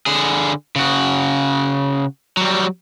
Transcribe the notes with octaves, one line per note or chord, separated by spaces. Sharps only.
D3 G#4
C#3 F#4
F#3 G3